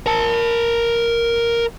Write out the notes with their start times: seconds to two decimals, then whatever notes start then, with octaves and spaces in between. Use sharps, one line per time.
0.06 A#4 A5